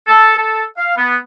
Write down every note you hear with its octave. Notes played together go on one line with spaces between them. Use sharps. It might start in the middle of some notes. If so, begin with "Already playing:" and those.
A4
A4
F5
B3